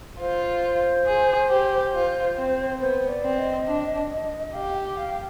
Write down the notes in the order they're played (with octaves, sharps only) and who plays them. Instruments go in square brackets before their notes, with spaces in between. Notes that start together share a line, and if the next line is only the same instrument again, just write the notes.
[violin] F4 [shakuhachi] C5
[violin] G#4
G4
F4
C4
[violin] B3 [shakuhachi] C5
[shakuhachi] D5
[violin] C4
[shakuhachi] D#5
[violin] D4
[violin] G4 [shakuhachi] F5
[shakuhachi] G5
F5